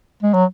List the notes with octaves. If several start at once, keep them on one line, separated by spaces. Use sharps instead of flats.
G#3
F#3